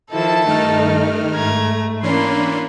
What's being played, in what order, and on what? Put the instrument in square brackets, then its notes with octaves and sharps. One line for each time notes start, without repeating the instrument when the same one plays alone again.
[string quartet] D#3 F3 E4 [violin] A4 A5
[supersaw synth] G2 D#3 F6 [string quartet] A3 D#4
[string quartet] G#2 A3 [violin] A#5 G#6
[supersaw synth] E3 C#4 D4 [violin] A#3 B5 [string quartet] C6